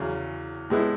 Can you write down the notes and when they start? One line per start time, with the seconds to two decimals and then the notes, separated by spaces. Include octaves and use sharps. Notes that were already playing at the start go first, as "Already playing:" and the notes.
Already playing: E2 C#3 F#3
0.70 A2 G#3 B3 E4